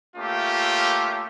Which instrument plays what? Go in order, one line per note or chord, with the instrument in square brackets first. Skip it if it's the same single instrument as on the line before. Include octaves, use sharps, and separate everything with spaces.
[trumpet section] A3 A#3 C#4 F4 G4